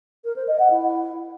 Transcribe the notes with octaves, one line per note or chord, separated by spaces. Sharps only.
A#4
C5
D#5
F#5
E4